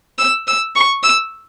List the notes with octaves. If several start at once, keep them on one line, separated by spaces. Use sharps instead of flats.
E6
E6
C#6
E6